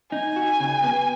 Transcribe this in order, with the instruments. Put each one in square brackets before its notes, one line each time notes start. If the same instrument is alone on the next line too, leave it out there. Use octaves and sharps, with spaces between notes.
[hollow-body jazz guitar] D#4 [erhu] G#5
[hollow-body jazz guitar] F#4
C#3
B3